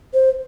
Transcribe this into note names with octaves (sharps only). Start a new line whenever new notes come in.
C5